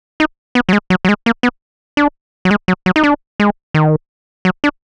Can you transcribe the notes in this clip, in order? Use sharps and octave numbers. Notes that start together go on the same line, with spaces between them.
D#4
B3
F#3
G#3
F#3
F#3
G#3
A#3
B3
D4
F#3
G#3
F#3
F#3
D#4
D4
G#3
D#3
F#3
D4